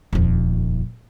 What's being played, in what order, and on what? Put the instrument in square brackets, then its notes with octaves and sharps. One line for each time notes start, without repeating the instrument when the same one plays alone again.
[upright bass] D#1 F2